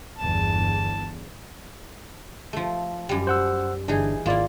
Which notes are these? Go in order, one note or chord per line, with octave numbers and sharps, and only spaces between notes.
G1 E2 A5
F3 A3
F#2 G3
C5 F#5 E6
G1 E3 D4 D#4 G#4
G#1 A#3 E4 F4 D5